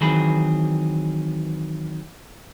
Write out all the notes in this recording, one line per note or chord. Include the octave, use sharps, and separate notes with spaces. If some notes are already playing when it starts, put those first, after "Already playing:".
D#3 E3 F#3 C4 G#4 B5